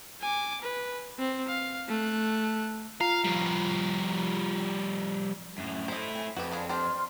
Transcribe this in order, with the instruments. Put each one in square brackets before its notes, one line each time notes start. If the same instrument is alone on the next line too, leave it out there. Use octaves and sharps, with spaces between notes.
[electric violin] G#5 D6
B4
C4
F5
A3 F#6
[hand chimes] F4 A#5 C7 [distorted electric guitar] F5
[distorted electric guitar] F3 G3
[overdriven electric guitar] F#2 A2
[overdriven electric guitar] A3 E4 [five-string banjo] C5 D#5
[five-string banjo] C4 [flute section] G#5
[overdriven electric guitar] F2 [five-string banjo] F#4 G4 [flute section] B4
[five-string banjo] D4 F4 G#4
[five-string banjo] D4 G4 C5 [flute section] C6 F6